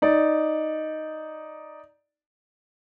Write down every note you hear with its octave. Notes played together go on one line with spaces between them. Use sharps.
D#4 D5